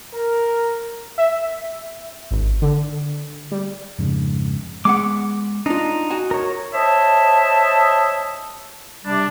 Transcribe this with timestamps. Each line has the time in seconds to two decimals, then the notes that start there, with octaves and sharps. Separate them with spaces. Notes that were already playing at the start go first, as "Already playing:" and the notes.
0.13 A#4
1.18 E5
2.31 G#1
2.62 D3
3.52 G3
3.99 F2 G#2 C#3
4.85 G#3 B3 F#5 D6
5.66 D4 D#4 F4
6.11 F#4 G#5
6.31 A#4 C#5
6.73 C5 C#5 D#5 E5 A5
9.05 C3 G3 D4